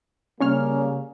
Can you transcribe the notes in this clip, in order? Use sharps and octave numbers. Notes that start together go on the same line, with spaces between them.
C#3 G3 A#3 C#4 C#5 F6